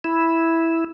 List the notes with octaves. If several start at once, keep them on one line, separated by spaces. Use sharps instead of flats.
E4